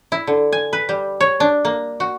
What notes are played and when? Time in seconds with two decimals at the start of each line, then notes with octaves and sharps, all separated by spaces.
0.12 E4
0.27 D3
0.52 G#5
0.73 B4
0.89 G3
1.20 C#5
1.40 D4
1.65 A#3
2.00 F#4